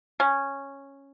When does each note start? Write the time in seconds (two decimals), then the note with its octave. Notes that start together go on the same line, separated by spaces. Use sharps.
0.20 C#4